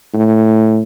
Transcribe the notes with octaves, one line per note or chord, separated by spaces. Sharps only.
A2